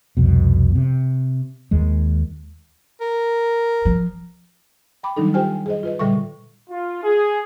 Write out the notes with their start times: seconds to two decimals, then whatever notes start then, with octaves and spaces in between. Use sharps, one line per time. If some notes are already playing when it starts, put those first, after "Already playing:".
0.17 C2 F2 B2
0.75 C3
1.71 D#2 D#3 G#3
3.01 A#4
3.85 F3
5.03 G5 B5 D6
5.17 D#3 F#3 G3 D4 D#4 A4
5.34 F4 G4 C5 G5 G#5 F6
5.66 G#4 C5 D#5
5.83 F4 B4 D#5
5.99 A#2 D3 G3 A4 E5 C#6
6.70 F4
7.04 G#4